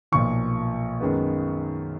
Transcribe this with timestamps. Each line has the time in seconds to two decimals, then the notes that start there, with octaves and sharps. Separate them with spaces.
0.12 B1 A#2 F3 C#6
1.00 F#2 D#3 G#3 B3